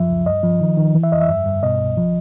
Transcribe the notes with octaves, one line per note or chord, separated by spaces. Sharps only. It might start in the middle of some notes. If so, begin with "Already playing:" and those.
Already playing: F#2 F3 E5
C#2
G2 D#5
F3
D#3
D#3
E3
E5
F2 D#5
E5
G2
G2
B2 D#5
C2
F3